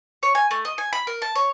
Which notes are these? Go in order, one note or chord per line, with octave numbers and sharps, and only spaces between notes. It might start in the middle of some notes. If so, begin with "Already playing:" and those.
C#5
G#5
A3
D#5
G#5
B5
A#4
A5
C#5